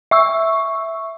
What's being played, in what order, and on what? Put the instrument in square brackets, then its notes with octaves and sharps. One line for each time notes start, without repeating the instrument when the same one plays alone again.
[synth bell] E5 C#6 E6